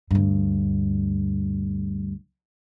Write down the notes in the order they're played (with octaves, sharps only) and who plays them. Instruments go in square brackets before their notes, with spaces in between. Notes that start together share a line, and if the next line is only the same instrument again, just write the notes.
[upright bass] D2 G2